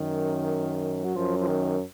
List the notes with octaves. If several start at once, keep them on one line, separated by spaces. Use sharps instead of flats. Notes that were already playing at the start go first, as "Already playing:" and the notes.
Already playing: F#2 D#3
F#3
F#2 F3
F3
D#3